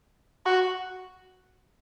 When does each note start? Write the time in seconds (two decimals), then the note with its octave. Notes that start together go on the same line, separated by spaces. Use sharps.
0.46 F#4